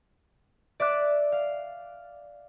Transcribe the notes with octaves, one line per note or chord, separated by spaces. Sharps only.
D5 E5 D6 F#6 A6
F5